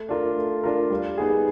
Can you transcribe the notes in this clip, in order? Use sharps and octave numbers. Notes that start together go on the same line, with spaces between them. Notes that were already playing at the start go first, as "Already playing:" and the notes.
Already playing: A3
D4 F4 A#4
A3
D4 F4 A#4
G3
B3 D#4 G#4